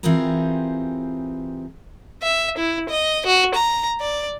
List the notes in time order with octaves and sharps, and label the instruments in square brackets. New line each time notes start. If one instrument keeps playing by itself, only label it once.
[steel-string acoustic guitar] E3 C4 F4 G4 G#4 A#4
[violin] E5
E4
D#5
F#4
A#5
D5